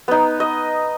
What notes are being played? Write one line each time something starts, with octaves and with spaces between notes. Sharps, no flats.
B3 D#4
D#5